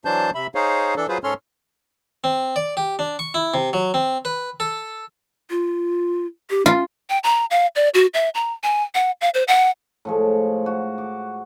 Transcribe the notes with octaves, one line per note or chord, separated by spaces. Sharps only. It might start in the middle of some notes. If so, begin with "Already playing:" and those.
E3 F#3 D4 C5 A5 G6
C3 E5 B5
D#4 G#4 C5 C#5 F5
E3 D4 A4
F#3 F4 G#4 B4 C5
G#2 C#4 A4 C#5 C6 F6
C4
D5
G4
D4
C#6
E4
C3
F#3
C4
B4
A4
F4
G4
C#4 F4
G5
A#5
F5
D5
F#4
E5
A#5
G#5
F#5
F5
C5
F#5
A2 F3 G#3
F#4
D6